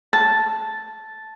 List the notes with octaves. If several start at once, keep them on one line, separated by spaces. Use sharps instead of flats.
A5